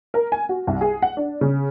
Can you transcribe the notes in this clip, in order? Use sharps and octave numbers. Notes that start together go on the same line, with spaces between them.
A#4
G#5
F#4
C2
G#4
F#5
D4
C#3